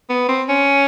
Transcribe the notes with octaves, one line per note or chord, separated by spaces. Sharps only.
B3
C4
C#4